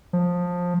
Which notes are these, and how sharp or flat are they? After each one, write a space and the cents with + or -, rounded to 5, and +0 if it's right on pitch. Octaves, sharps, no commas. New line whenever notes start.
F3 +20